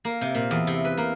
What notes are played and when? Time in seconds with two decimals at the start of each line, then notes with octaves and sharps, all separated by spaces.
0.05 A#3
0.21 C3
0.35 A#2
0.51 E2
0.67 C3
0.85 B4
0.98 A#3